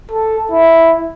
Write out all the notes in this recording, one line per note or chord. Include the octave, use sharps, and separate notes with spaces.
A4
E4